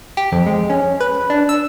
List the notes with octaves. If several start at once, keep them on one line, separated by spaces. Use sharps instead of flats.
G4
F2
G#3
C#4
B4
D4
E6